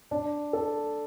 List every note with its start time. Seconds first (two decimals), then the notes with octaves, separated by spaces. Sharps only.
0.11 D4
0.53 A4